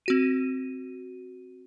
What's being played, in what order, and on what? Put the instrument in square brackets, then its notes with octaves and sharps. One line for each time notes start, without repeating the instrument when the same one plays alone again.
[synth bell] C4 F#4 D#7